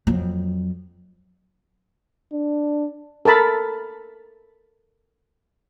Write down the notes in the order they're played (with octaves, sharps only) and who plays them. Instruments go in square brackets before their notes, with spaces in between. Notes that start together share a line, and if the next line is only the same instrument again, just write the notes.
[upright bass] F2 F#3
[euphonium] D4
[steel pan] A4 A#4 A5 B5